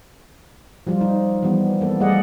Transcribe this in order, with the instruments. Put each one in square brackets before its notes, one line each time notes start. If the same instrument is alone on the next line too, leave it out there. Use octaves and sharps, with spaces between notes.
[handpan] F3 G3 F4
D#4
E3 F3 G3 B3
A#3 B3 A4
G3 A3 G#4 D5 D#5 F#5